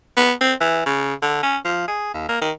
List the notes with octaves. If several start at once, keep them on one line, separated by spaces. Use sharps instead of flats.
B3
C4
E3
C#3
D3
C#4
F3
G#4
D#2
A#3
D#3